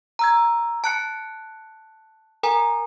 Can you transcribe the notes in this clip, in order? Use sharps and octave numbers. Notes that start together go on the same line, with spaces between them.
A#5 E6 G#6
A5 F#6 C#7
A#4 G#5 A#5